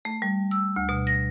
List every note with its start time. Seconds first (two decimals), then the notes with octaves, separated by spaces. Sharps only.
0.05 A3
0.22 G3
0.51 E6
0.76 D2
0.89 B2
1.07 A#6